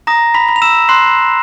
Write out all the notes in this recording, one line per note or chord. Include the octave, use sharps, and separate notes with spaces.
A#5 D#6 A#6
B5 B6
B5
F7
E6 E7
C6 F#6 C7